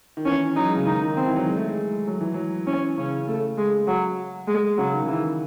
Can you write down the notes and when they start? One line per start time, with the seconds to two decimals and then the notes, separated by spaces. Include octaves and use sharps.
0.17 D#3
0.26 E3 C#4
0.56 F#3 D#4
0.66 G#3
0.76 C#3
0.86 D#3 D#4
1.01 D#3
1.16 C4
1.26 E3
1.36 F#3
1.47 G#3
1.57 A3
1.66 G#3
2.07 F#3
2.21 E3
2.34 F#3
2.67 E3 C#4
2.97 C#3 C#4
3.27 A3
3.58 G#3
3.87 F#3
4.47 G#3
4.78 C#3 F#3
4.93 D#3
5.02 C#3
5.08 D#3 E3